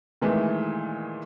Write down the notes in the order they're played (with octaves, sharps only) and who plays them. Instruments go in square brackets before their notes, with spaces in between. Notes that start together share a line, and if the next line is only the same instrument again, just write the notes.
[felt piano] A#2 D#3 E3 G#3 A3